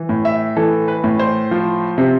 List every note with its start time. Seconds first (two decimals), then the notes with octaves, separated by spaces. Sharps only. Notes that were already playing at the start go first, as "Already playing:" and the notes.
Already playing: E3
0.09 A2
0.25 E5
0.57 E3 A4
0.88 B4
1.04 A2
1.19 C5
1.51 F3
1.98 C3